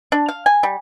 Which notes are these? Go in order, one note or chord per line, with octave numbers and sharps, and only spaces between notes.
D4
F5
G#5
G3